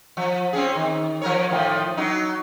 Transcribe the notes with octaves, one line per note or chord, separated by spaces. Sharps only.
F3
C4 C#4 G#4
D#3
F3 A#4 C#5
A2 D#3 F3
F#3 D#4